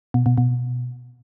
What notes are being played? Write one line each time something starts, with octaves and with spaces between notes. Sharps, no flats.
B2
B2
B2